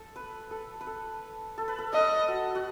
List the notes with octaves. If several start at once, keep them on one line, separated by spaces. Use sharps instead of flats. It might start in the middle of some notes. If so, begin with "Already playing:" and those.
Already playing: A4
B4
A4
B4
A4
A4
B4
A4
A4 D#5
F#4
F#4